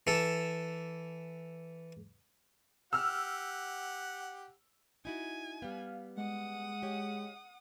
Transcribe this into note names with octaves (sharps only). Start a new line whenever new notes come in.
E3 A4
G4 F#5 E6 F6
D#4 E4 F#4 G#5
G3 B3 F5
G#3 F#5 D#6
G4 C#5